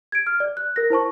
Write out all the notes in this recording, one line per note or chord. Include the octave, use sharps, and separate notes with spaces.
G#6 D7
F6
D5
F#6
A#4 A#6
E4 C5 A5 C#6